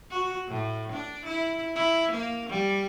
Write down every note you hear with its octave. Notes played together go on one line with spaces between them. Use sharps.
F#4
A2
D4
E4
E4
A#3
G3